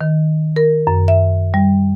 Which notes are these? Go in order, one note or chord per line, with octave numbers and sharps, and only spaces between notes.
D#3
A#4
F#2
E5
G3